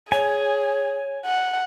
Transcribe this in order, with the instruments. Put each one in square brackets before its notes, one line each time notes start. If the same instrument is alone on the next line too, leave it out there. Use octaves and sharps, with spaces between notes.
[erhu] G#4 [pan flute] C#5 [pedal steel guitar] G#5
[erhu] F#5